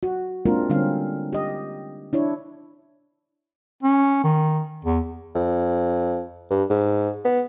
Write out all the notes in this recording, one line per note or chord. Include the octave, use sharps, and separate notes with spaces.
F#4
G#3 A#3 C4 D4 F4 A#4
D3 G3 C4 C#4 F5
G4 D#5
D4 E4 C#5
C#4
D#3
E2
F2
G2
G#2
B3